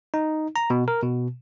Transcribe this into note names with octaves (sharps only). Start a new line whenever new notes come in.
D#4
A#5
B2
A#4
B2